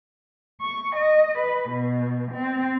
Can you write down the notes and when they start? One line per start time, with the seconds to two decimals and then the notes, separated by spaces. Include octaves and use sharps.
0.61 C#6
0.95 D#5
1.38 B4
1.69 B2
2.33 C4